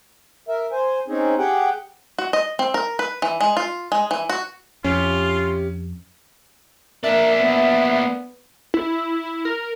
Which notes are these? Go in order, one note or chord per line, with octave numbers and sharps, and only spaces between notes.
A#4 E5
C5 G#5
C4 C#4 D#4 G#4
G4 G#4 F#5 G5
F#4
D#5
C4
A#4
B4
E3
G#3
F4
G#3
E3
F#4
F2 C#4 E4 F4 G4
A#3 D4 A#4 E5
B3
E4
A#4